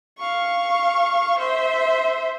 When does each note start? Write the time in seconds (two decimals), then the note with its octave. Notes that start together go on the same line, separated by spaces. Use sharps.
0.19 F5 C#6
1.39 C5 E5